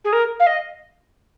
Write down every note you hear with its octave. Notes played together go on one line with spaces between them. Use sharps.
G#4
A#4
F5
D#5